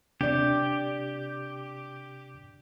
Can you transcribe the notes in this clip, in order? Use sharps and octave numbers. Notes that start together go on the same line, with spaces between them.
C3 D4 G4 D5